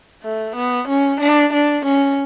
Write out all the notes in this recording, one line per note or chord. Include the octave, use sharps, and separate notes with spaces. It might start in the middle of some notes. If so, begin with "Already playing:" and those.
A3
B3
C#4
D4
D4
C#4